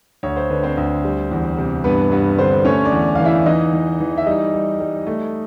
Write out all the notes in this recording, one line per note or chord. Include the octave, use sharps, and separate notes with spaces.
D2 C#5
C5
D3 B4
C4 C5
D2
G3
E2
C3
G2 B3 B4
G2 B3 B4
D3 C4 C5
A3 C#4 C#5
D4 D5
E2
E3 F5
E4 E5
E3 D#4 D#5
E3
E3
E5
G3 D#4 D#5
G3
G3
A3